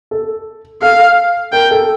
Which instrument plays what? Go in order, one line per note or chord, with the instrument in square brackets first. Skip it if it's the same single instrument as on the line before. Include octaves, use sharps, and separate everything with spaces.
[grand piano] A4
[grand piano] A4 [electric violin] F5
[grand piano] A#4 [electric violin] G5
[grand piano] A4